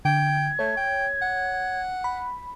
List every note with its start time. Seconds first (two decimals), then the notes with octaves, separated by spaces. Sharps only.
0.05 D3 G5 G#6
0.59 A3 C#5
0.77 G5
1.22 F#5
2.04 B5